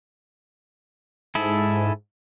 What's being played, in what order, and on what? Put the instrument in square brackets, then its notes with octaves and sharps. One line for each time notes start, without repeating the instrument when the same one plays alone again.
[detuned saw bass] G#2 [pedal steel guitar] E4 G#4 A4